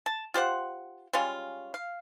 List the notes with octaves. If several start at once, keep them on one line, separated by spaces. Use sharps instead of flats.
A5
F4 G4 C5 F#5
G3 G#3 C#4 F4
F5